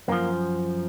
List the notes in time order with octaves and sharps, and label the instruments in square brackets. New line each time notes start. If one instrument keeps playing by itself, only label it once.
[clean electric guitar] F#2 F3 A#3